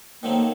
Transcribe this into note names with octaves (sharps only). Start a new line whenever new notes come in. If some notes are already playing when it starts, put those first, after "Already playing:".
D#3 F#3 A3 A#3 C4